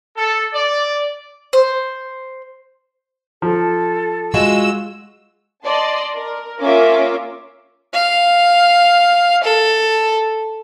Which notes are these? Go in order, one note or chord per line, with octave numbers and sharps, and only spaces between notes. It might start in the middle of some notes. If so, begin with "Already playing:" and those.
A4
D5
C5
F3 A4
G#3 F4 F#4 E6
D5 D#5 A5 C6
A#4
A#3 C#4 F4 A#4 E5 D6
F5
A4